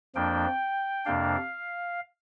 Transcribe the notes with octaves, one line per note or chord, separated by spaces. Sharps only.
F2 F3 A#3 D4 G5
F2 C3 A#3 D4 F5